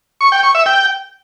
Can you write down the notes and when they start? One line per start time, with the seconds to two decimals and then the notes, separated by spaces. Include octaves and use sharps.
0.21 C#6
0.32 G5
0.43 C#6
0.55 E5
0.66 G5